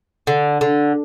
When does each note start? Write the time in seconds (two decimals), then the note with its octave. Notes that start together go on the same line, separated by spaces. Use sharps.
0.27 D3
0.61 D3